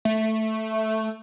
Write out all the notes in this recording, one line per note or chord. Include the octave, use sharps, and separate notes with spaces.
A3